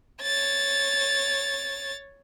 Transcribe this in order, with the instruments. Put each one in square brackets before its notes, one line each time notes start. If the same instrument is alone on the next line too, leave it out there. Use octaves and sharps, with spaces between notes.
[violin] C#5 A6